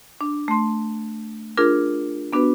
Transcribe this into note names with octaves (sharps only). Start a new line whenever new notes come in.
D4
A3 C6
D4 F4 G#4 A#4
B3 D4 F#4 B4